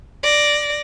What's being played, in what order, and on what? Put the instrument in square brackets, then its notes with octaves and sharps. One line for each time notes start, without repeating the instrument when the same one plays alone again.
[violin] D5 A#6